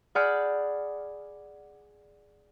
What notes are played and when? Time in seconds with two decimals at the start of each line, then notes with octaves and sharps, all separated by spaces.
0.15 G#4 D5 F#5 B5 F6 G6